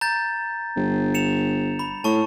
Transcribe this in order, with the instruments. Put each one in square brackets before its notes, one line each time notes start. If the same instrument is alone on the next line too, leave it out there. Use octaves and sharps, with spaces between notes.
[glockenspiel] A#5 G6 A6
[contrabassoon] G1
[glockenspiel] C#7 E7 F7
B5
[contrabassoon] A2 [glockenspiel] A5 C#6